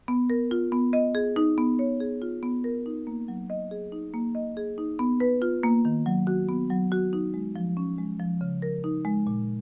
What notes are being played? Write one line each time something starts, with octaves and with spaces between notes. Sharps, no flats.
B3
A#4
F4
B3
D#5
G#4
D#4
B3
C#5
G#4
F4
B3
A#4
D#4
A#3
F#3
D#5
G#4
D#4
A#3
D#5
G#4
D#4
B3
B4
F4
A#3
D#3
F#3
F#4
B3
F#3
F#4
D#4
G#3
F3
C#4
G#3
F3
C#3
A#4
D#4
G#3
A#2